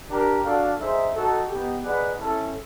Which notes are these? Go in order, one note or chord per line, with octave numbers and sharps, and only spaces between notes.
D4 G4 A#4
D4 F#4 A4 D5 F5
D#4 G#4 C5 E5
D#4 F#4 A4
B3 D#4 G4
D#4 G#4 B4 D5 F#5
C#4 E4 A4